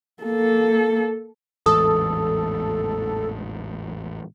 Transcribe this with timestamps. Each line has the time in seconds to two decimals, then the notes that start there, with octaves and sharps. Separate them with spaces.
0.23 A#3 A4
1.66 A1 E2 G#2 A4 D#6